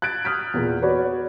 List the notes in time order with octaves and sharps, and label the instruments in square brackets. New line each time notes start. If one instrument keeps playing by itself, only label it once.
[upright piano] F#6 G#6 A6 D7
D#6 F6 G6 B6 D7
E2 A#2
F#4 B4 C#5 D5